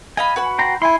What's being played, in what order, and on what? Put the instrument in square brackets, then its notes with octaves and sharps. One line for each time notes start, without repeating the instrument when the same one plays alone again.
[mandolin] D#5 F5 B5 [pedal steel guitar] G#5
[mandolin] F#4 B4 F#5
[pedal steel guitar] G5 A#5 C6
[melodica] E4 [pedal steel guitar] G#5 C6